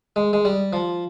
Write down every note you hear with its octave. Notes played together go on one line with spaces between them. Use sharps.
G#3
G#3
G3
F3